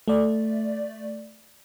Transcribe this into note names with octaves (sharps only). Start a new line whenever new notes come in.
A3 D5